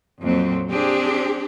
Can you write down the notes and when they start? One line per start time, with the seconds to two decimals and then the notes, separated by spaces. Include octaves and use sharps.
0.21 F2 A#2 F#3 C4
0.68 C4 D4 G4 G#4